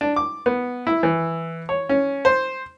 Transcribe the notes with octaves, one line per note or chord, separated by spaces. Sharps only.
D4
D6
B3
E4
E3
C#5
C#4
C5